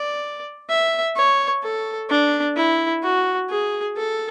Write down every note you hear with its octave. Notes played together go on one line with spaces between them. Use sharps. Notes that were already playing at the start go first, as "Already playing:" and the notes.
Already playing: D5
E5
C#5
A4
D4
E4
F#4
G#4
A4